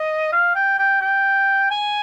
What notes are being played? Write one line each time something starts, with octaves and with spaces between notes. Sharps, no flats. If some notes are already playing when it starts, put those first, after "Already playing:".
Already playing: D#5
F5
G5
G5
G5
G#5